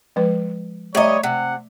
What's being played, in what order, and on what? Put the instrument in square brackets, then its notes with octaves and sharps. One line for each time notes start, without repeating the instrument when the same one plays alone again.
[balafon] F3 G#3 B4
[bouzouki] G3 D#5 [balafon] A3 E5 A#5 [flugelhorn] C#5
[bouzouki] C3 [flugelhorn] F#5